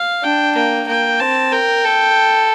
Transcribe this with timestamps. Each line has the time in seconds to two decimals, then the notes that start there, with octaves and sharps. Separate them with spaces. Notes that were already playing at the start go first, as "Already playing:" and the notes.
Already playing: F5
0.23 D4 G5
0.55 A#3 G5
0.88 A#3 G5
1.20 C4 A5
1.52 A#4 G5
1.85 A4